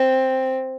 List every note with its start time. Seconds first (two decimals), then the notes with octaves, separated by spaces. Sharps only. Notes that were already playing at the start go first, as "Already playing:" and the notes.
Already playing: C4